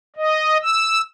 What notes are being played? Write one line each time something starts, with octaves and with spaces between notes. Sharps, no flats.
D#5
E6